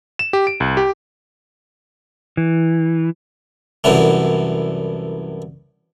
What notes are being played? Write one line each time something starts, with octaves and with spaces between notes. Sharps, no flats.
E7
G4
D7
C2
G4
E3
C2 F#2 E3 F#3 A3